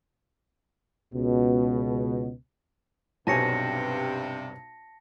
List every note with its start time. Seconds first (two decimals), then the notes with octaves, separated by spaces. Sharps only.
1.14 C#2 B2
3.27 B1 G2 C3 C#5 G#5 A5 A#6 C#7